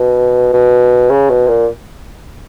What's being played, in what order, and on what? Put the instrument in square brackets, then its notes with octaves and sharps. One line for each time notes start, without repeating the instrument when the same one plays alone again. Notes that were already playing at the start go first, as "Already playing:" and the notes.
Already playing: [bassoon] B2
B2
C#3
B2
A#2